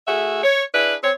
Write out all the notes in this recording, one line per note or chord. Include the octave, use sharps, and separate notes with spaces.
A3 F#4 G#4 E5
C#5
D4 E4 G#4 B4
C4 C#5